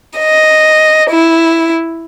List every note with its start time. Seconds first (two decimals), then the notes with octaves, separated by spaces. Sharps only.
0.17 D#5
1.12 E4